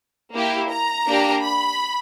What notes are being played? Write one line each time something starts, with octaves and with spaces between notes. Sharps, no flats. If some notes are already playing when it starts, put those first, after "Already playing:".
A#3 E4 G4
A#5
A#3 D4 G4
B5